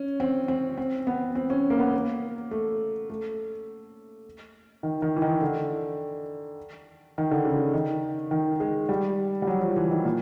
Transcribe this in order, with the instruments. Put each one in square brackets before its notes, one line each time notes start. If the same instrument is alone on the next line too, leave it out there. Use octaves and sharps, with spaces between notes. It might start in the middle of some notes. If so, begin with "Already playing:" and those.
Already playing: [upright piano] C#4
C4
C4
C4
B3
C4
C#4
A#3
B3
A#3
A3
A3
D#3
D#3
E3
D#3
D3
D#3
D3
C#3
D#3
D#3
G#3
G3
G3
F#3
F3
E3
D#3
A#2